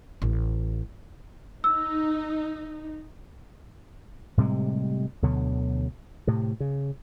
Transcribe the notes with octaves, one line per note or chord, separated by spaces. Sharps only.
A1
D#4 E6
A2 C3 G3 G#3
D2 B2 D3 F#3
A2 C3
C#3